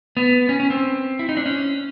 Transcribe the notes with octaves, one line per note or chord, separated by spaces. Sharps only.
B3
C#4
C#4
C4
E4
D#4
D4
C#4